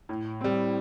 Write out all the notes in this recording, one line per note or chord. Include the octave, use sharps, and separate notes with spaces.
A2
G3 C4